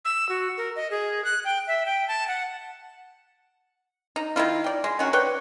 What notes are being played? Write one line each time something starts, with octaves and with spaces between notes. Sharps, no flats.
E6
F#4
A#4
D#5
G#4
F#6
G5
E5
G5
A5
F#5
D#4
D#3 A#3 E4 F4
D5 G5
G#3
D#3 F#3 C#4 F#4
B4 C#5 D5 G5